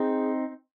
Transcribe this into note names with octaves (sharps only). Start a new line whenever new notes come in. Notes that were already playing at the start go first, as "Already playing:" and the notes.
Already playing: C4 D#4 G#4